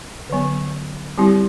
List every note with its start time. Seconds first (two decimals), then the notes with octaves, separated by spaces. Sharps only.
0.30 D3 F#3 B3
1.18 G3 C4 E4 G4